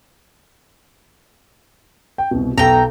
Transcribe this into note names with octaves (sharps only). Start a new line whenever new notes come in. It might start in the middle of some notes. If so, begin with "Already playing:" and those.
G5
C2 B2
B1 A4 G5 A#5